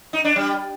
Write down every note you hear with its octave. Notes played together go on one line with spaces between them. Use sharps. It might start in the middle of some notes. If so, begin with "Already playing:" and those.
D#4
D4
G3